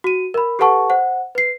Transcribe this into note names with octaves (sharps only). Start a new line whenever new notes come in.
F#4 D#7
A#4 B5
G4 A4 B4 F#5 A5 C#6
C5 F#5
B4 C7